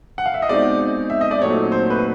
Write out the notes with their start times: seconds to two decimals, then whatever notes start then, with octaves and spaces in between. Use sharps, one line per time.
0.18 F#5
0.26 F5
0.34 E5
0.42 D#5
0.49 B2 G#3 C4 D#4 D5
1.10 E5
1.21 D#5
1.31 D5
1.40 A#2 F#3 A3 C4 D#4 C#5
1.72 C5
1.90 B4